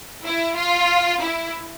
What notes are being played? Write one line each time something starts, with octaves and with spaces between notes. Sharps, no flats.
E4
F4
E4